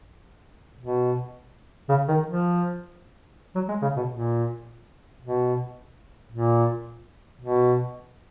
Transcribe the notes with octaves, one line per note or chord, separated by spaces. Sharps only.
B2
C#3
D#3
F3
F#3
G#3
C#3
B2
A#2
B2
A#2
B2